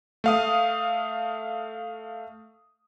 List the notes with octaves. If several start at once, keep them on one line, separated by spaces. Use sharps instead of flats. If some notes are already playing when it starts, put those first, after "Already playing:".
A3 F5 D#6